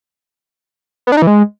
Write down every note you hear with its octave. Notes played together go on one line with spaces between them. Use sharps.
B3
D4
D#4
E3
G#3